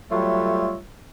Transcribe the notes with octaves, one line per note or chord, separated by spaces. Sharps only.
F#3 G3 A3 F4 C#5 E5